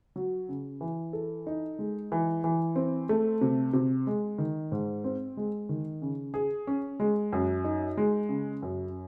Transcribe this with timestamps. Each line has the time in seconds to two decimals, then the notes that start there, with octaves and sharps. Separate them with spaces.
0.16 F#3
0.49 C#3
0.81 E3
1.13 A4
1.47 D#4
1.79 G#3
2.12 E3
2.44 E3
2.76 C4
3.09 A3
3.41 C3
3.73 C3
4.07 G#3
4.38 D#3
4.72 G#2
5.04 C4
5.37 G#3
5.69 D#3
6.02 C#3
6.34 G#4
6.67 C#4
7.00 G#3
7.32 F#2
7.64 D#4
7.97 G#3
8.29 C#3
8.62 F#2